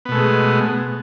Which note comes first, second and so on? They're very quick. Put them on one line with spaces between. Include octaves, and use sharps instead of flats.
B3 B2 A3 G#3